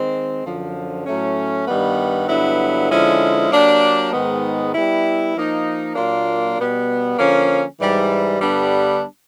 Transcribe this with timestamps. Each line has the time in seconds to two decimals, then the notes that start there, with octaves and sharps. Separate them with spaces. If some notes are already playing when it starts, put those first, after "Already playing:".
Already playing: D#3 G#3 C4
0.45 F#2 D3 F3
1.05 A2 F#3 A3 C#4
1.67 G2 D#3 G3 B3
2.28 G2 D3 F#3 B3 E4
2.90 D3 F3 G#3 C#4 E4
3.51 F#3 A#3 D4 G4
4.13 G#2 D#3 G#3 B3
4.74 G3 B3 E4
5.35 F3 A#3 D#4
5.96 A#2 F#3 A#3 D4 F4
6.57 B2 G3 B3
7.18 D3 F3 A#3 C#4
7.80 G#2 E3 G3
8.40 G2 D3 G3 B3 D4